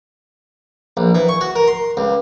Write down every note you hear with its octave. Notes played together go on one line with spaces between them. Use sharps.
A#1
E3
C#6
F#4
A#4
C6
C#2